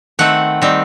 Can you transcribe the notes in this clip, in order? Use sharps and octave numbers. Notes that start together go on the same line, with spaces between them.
D#3 A3 C4 F#5
D#3 G3 C4